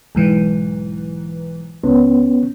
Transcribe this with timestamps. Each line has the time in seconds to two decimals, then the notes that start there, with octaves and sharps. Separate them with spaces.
0.15 B1 G#2 E3
1.84 C#2 B3 C#4